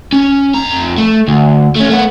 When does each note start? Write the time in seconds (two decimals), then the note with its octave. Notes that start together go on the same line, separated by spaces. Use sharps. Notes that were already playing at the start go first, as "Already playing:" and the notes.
0.13 C#4
0.54 F2 A#5
0.98 A3
1.28 D2
1.76 A3 C#4
1.90 A3 B3